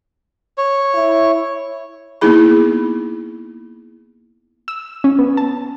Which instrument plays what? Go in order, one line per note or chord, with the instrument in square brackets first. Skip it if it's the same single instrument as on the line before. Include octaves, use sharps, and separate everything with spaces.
[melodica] C#5
[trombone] E4
[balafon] A#3 B3 D#4 E4 G#4 B5
[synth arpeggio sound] E6
C#4
B3
A5